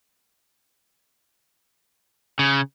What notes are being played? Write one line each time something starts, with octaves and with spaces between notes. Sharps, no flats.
C#3